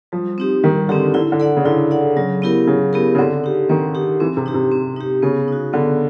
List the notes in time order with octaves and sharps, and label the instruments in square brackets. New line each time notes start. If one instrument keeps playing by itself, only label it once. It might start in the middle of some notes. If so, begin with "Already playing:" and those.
[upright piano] F3 [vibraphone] G3
[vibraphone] C4 D#4 G4
[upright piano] D#3 [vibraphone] G3
[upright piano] D3 [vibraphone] C4 D#4 G4
[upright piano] D3 [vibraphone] E4
[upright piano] D3
[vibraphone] A4 D5 F#5
[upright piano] C#3
[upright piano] D3 [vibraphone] E4
[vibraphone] A4 D5 F#5
[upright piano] C#3 [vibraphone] F#3
[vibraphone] B3 E4 G4 A#4
[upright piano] C#3 [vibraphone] F#3
[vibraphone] B3 E4 G4 A#4
[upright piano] C#3
[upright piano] D3 [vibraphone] C4
[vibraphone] D#4 G4
[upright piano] D#3 [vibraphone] C4
[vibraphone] D#4 G4
[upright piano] E3 [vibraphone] C4
[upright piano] C3
[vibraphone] D#4 G4
[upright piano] C3
[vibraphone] C4
D#4 G4
[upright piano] C#3 [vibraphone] B3
[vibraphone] D#4 F#4
[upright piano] D3 [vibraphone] B3